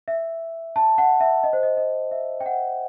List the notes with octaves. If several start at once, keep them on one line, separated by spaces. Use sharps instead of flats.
E5
A5
F#5
E5
D#5
C5
D#5
D#5
E5
G5
F#5